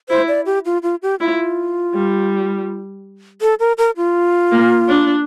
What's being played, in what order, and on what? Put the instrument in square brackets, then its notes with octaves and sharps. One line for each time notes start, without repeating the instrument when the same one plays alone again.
[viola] E4 [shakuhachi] C5
[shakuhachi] D5
G4
F4
F4
G4
[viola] E4 [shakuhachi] F4
[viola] G3
[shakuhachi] A4
A#4
A#4
F4
[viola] A#3
D4